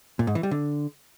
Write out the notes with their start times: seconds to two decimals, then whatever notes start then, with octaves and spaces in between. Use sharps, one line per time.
0.19 A#2
0.27 G#2
0.35 E3
0.43 G3
0.51 D3